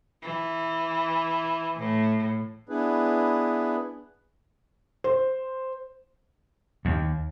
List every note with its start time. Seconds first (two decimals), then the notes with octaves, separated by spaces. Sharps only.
0.22 E3
1.80 A2
2.68 B3 D4 E4 G#4 B4
5.04 C5
6.85 D#2